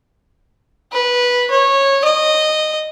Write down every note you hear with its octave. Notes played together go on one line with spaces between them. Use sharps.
B4
C#5
D#5